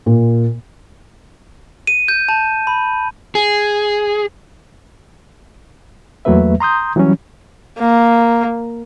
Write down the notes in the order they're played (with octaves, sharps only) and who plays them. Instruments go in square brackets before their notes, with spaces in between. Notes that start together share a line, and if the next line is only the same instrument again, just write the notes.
[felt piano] A#2
[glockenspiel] D#7
G6
A5
B5
[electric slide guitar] G#4
[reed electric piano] E2 F#3 A3 A#3 B4 E5
A#5 C6 D#6 G6
E3 F#3 G3 C#4
[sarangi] A#3